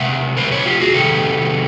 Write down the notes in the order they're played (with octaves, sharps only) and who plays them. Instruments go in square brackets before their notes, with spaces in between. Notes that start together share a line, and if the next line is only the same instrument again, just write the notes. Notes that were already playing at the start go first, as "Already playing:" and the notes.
Already playing: [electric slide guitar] C3 G#3 E5 F#5
A#4 C5
B4 C#5
F4 G4
F#4 G#4
C3 D#3 G3 G4 A4